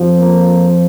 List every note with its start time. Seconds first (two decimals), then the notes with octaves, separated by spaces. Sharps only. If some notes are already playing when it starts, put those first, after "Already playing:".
Already playing: F2 F3
0.18 A#3